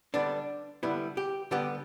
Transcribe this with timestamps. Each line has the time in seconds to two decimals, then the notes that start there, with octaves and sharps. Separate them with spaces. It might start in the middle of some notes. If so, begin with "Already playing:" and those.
0.14 D3 G3 B3 D4
0.83 D3 G3 B3 E4
1.17 G4
1.51 D3 G3 B3 G4